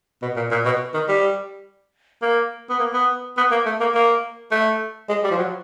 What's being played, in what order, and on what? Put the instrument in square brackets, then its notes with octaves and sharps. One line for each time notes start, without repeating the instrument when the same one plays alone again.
[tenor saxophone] B2
A#2
A#2
B2
D#3
G3
A#3
B3
A#3
B3
B3
A#3
A3
A#3
A#3
A3
G#3
G3
F3
F#3